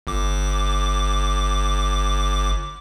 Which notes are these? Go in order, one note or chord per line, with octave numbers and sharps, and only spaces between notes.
G1 D6